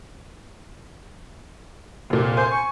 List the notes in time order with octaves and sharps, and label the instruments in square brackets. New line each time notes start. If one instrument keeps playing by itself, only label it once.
[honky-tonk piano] F1 A#2
[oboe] C5 [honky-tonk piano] G#5
[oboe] C#6